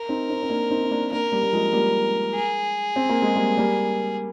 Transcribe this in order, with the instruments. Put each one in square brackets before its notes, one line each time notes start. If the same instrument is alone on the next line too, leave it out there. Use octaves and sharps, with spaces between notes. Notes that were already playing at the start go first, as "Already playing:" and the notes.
Already playing: [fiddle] A#4
[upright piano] C4 D#4
C4 D#4
C4
A#3 D4
C4 D#4
D#4
A#3 D4
[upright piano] A#3 D4 [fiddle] A#4
[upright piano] G3 A#3
G3
F3 G#3
G3 A#3
[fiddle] G#4
[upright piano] C4
A#3
G#3
G3 A#3
G3 A#3